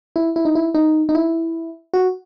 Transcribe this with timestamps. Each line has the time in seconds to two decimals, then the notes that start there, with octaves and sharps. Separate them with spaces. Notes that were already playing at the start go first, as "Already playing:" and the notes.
0.16 E4
0.36 E4
0.45 D#4
0.55 E4
0.75 D#4
1.09 D#4
1.15 E4
1.94 F#4